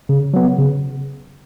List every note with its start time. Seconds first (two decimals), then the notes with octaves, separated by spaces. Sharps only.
0.09 C#3
0.34 F#3 B3
0.58 C#3